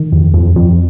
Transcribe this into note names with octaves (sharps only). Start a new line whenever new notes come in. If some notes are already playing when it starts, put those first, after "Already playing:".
Already playing: D#3
F2
F2
F2